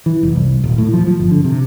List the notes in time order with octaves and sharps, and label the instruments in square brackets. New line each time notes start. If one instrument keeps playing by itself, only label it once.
[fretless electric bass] E3
F1
C2
D#1
A2
F3
F3
G1
D3
C3